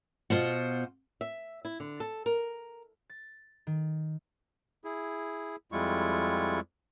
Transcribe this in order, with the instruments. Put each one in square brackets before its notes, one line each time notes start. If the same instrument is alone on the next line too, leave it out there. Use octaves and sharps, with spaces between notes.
[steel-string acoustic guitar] B2 F4 C5 F#5
[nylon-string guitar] E5
E4
D3
A4
A#4
[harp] A6
D#3
[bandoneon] E4 G#4
F2 G3 G#3 E4 F4 C#6